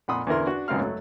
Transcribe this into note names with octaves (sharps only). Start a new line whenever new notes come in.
F2 A#2 F#5 B5 C6 D#6
E2 D3 E4 A#4 C6
D4 F#4
G#1 C#2 F#2 C4 F5 F6
F#3 A3